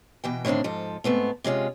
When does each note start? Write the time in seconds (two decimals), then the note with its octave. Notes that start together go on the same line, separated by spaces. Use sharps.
0.24 B2 E3 G5
0.45 A2 D3 D#3 C4 D4
0.64 G#2 F3 A4
1.04 G#2 A3 B3 C4
1.44 C3 G#3 C#4 F4